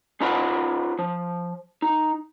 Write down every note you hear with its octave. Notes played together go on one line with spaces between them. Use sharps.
C#4 D#4 F4 B4 F#5 B5
F3
D#4